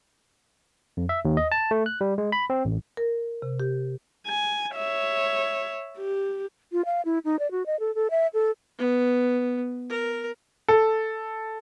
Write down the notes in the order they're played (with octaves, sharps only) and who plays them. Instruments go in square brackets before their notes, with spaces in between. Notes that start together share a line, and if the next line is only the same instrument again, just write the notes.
[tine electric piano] F2
E5
D#2
D#5
A5
A3
F#6
G3
G#3
B5
C4
A1
[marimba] A#4
C3
G4
[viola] G#5
C#5 E5
G4
[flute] F4
F5
E4
D#4
D5
F#4
D#5
A4
A4
E5
A4
[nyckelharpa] B3
A#4
[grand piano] A4